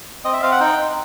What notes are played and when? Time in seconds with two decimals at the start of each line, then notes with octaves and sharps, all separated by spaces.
0.24 C4 D#5
0.33 E5
0.42 C4 F5
0.52 F#5
0.60 D#4 G5
0.78 D#4